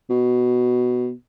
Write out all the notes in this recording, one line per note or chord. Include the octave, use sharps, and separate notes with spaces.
B2